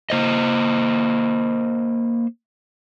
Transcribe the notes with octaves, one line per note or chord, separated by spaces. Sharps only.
A#3 C5 D#5